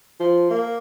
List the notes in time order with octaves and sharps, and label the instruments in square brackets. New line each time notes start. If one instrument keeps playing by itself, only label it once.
[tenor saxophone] F3
A#3